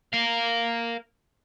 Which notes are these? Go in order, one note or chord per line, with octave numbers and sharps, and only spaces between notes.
A#4 F5